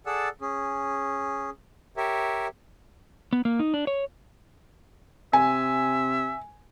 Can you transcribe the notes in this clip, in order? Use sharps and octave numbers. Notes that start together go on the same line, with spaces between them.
G#4 A4 D5 F#5 E6
C#4 G#4
G4 A#4 C#5 E5
B3
A#3
D#4
D4
C#5
C3 E5 G#5